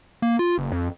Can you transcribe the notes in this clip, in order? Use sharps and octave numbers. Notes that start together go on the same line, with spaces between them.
A#3
F4
F#1
F2